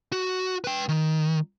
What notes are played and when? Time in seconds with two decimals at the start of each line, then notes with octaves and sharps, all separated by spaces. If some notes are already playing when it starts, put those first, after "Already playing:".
0.12 F#4
0.64 B4 G5
0.89 D#3